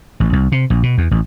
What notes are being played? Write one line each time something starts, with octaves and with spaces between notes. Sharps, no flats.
A1
C2
C3
A#1
B2
E2
A1